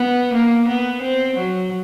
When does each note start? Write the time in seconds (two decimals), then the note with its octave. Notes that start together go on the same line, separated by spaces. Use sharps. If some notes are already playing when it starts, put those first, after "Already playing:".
Already playing: B3
0.34 A#3
0.68 B3
1.02 C4
1.37 F#3